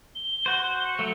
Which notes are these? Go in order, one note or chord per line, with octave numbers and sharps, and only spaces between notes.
G7
F#4 C5
C#7
F#3 A3